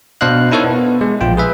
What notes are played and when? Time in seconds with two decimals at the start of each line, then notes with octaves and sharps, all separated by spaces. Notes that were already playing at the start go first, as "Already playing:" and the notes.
0.21 B2 D4 C5 D#5 F5 F#6
0.51 D#4 E4 A4 A#4 C#5
0.64 B3
1.01 G#3
1.21 A#1 F4 G5
1.37 G#4 B4 E5